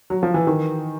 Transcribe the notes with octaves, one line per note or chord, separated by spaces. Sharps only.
F#3
F3
E3
D#3